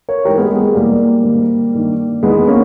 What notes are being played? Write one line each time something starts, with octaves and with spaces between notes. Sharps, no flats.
A#4 C#5
G#2 E3 G4 A#4
G#3 B3
G#3
G#3
E2 B2 G3 A#3
G#2 D#3
G2 D#3
E2 D#3 G#3 B3
A#3 C#4